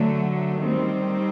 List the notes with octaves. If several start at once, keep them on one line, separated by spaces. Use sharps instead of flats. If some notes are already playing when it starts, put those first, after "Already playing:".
Already playing: D3 F#3 A3
D#3 G3 C4